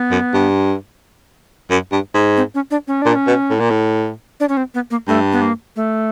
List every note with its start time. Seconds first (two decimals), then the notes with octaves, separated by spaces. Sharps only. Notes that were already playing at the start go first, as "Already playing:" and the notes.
Already playing: B3
0.11 F#2
0.34 G2
1.70 F#2
1.92 G2
2.14 G#2
2.37 C4
2.55 C#4
2.71 D4
2.88 C#4
3.02 A#2 D4
3.15 C#4
3.27 B2
3.50 A2
3.60 A#2
3.70 A2
4.40 D4
4.49 C#4
4.57 C4
4.74 B3
4.91 A#3
5.07 G2 A3
5.33 B3
5.42 A#3
5.76 A3